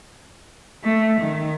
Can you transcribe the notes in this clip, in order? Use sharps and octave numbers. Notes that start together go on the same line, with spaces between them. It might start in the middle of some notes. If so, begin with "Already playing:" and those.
A3
D#3